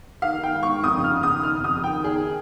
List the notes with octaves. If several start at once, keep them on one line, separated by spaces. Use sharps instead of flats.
D#3 F5
D#3
G5
G#2
C#6
D#3
F2 D#6
C#3
F6
C#3
D#6
C#3
D#3 F6
F2
D#6
D#3
G5
D#3
D#3 G#4